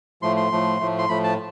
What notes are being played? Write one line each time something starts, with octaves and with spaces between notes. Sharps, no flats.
A2 F3 A3 C6
C6
A2 F3 A3
A2 F3 A3
C6
A2 F3 A3 B5
A5